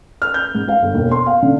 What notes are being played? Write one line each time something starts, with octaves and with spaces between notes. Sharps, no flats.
F6
G6
G#2
F5
G1
E1
C6
F5
D3